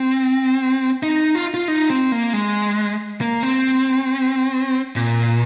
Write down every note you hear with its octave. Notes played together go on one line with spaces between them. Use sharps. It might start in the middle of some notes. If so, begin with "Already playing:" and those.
Already playing: C4
D#4
F4
F4
D#4
C4
A#3
G#3
A#3
C4
A#2